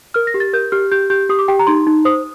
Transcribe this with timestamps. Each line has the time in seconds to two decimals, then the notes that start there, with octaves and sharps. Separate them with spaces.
0.14 A#4 F6
0.27 A#6
0.34 G4
0.40 A6
0.53 A#4 G6
0.72 G4 F6
0.92 G4 G6
1.10 G4 G6
1.29 G4 D#6
1.39 D6
1.48 G4 G5
1.59 A#5
1.67 D#4 C6
1.87 D#4
2.05 C5 D#6